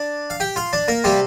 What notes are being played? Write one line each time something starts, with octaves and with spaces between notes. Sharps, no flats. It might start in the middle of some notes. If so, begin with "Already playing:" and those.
Already playing: D4 D5
F5
G4 G5
F4 F5
D4 D5
A#3 A#4
C3 G3 A#3 G4